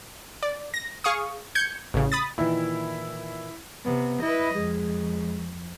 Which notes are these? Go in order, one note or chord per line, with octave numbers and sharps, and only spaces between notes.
D5
A#6
G#4 F5 C#6 D#6
G6 G#6 C#7
A1 C#3
B5 D#6 A6
A#2 D#3 E3 E4
C3 B3
E4 B4 D#5
F2 G#3